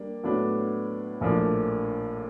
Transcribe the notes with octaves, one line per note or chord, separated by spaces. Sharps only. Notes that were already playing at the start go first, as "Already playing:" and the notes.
Already playing: G3 A#3 D4
A2 F#3 B3 D4
A#1 A2 F3 A#3 D4